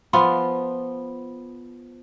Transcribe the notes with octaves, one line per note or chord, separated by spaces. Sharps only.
F3 B3 F4